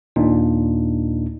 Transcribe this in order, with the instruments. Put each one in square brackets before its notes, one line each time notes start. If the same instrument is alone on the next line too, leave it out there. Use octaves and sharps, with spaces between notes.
[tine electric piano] D#2 A#2 A#3 D4 D#4